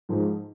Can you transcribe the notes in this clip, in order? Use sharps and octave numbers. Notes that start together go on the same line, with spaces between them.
G#2 F3 G#3 D#4